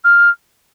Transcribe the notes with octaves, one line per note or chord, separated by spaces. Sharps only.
F6